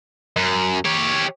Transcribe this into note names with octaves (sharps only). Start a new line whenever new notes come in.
F#2
G4 C#5